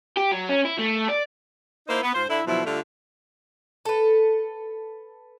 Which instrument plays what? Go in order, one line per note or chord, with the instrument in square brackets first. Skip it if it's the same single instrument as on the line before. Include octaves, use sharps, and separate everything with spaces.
[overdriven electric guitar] G4
F#3
C#4
E4
A3
D5
[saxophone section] A#3 D#4 E4 C5
B3
G#2 F4 C5
D3 E4
B2 D3 F3 F#3 E4
D3 G3 A3 F4
[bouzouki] A4 B4